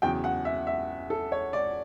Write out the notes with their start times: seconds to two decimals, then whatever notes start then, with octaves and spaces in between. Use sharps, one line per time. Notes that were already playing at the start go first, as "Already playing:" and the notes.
0.02 E2 C#3 F#3 G5
0.24 F#5
0.45 E5
0.67 E5
1.10 A4
1.32 C#5
1.53 D5